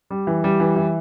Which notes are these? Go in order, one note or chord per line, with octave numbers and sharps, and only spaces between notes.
G3
E3
G3
E3
E3